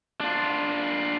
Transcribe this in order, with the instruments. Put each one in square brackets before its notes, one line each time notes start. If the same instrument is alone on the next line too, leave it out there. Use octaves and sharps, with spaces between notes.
[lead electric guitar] D4 F4